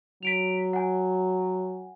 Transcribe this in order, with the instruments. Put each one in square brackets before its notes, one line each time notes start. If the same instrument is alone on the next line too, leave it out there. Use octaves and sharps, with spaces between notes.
[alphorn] F#3 [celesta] B6 D7 F7
[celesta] F#5 G#5